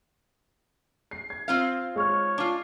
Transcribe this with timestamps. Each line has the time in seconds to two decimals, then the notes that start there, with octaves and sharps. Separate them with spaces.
1.11 C7
1.30 G#6
1.48 C4 F4 F5
1.96 G#3 C#5 C#6 F6
2.38 D4 F4